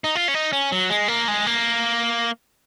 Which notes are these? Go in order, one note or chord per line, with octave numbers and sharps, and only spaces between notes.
D#4
F4
C#4
D#4
C#4
F#3
G#3
A#3
G#3
A#3